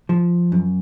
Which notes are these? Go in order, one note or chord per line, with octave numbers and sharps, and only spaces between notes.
F3
F#2